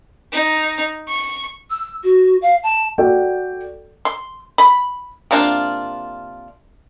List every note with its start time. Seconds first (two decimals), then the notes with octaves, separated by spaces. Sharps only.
0.33 D#4
1.08 C#6
1.70 E6
2.03 F#4
2.42 F5
2.63 A5
2.98 F#4 A4 D5 G5
4.05 C6
4.58 B5
5.31 C3 A#3 D4 F4